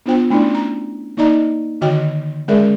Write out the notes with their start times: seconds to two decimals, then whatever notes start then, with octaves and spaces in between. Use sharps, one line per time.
0.06 B3 D4 F4 C5 G5
0.30 A3 C#4 D4 E4 D5
0.55 A#5
1.17 A#3 D#4 D5 D#5 A#5
1.81 D3 D#3 F#4 D#5 G5
2.48 G#3 C#4 G#4 A#4 D5 E5